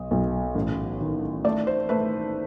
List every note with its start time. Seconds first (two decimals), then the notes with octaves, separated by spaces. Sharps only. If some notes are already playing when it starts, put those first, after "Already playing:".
Already playing: B1 D#5
0.11 B1
0.55 A1
1.01 D#3
1.44 A3 D5
1.67 C5
1.89 A3 B4